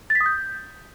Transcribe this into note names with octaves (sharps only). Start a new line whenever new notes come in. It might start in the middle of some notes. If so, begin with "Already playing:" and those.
A6
B6
D#6
G6